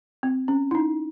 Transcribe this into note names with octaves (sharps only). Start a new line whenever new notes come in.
C4
C#4
E4
D#4